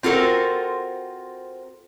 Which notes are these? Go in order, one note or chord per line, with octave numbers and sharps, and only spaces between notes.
C4 F4 F#4 A4 A#4 C5